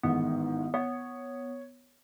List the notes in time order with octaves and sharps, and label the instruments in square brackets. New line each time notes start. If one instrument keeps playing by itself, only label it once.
[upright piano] A1 G#2 D#3 [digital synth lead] B3
[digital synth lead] B3 [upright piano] C#5